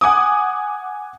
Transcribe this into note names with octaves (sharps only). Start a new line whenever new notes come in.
F#5 G#5 D6 D#6